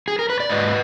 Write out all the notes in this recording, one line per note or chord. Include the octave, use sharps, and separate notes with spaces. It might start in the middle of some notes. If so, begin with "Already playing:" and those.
G#4
A#4
B4
D5
G#2 B4 D#5